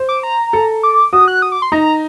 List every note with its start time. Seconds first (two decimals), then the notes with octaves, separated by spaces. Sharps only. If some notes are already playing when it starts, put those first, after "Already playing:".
Already playing: C5
0.09 D6
0.23 A#5
0.53 A4
0.83 D6
1.13 F#4 D#6
1.28 F#6
1.42 D#6
1.52 D6
1.62 C6
1.72 D#4 A#5